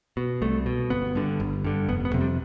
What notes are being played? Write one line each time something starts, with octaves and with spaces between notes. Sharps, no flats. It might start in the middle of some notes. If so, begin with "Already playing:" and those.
B2
C2 A3
B2
G1 B3
G2 D3
G1
G2 D3
F1 B3
B3
F2 C3
G3